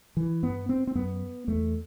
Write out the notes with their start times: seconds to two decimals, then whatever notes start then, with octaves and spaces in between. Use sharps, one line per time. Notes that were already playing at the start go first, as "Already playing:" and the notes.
0.17 E3
0.43 G2 B3
0.69 C4
0.87 C4
0.95 F#2 B3
1.48 E2 A3